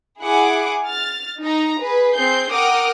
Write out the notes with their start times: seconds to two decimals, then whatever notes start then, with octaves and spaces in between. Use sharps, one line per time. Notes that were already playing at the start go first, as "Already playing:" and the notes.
0.20 E4 G#4 F#5 G#5 D6
0.85 F6 A6
1.42 D#4 A#5
1.79 G#4 B4
2.12 C4 G#4 G6 C7
2.52 A#4 F#5 G5 D6 D#6 F6